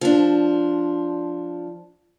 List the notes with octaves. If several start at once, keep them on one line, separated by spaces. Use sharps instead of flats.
F3 D4